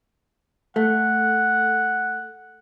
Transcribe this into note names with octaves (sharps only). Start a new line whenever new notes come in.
A3 F#5